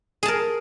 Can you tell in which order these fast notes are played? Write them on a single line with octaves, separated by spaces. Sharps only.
G#4 A5 A#4